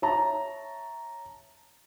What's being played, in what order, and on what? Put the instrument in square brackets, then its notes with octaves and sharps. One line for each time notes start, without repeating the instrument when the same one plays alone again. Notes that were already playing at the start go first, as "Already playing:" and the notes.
[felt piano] C#5 E5 A5 A#5